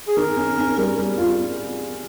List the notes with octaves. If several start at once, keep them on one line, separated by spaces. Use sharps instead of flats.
G#4
D#3 A#4
C#4
C#4
G3
G3
F4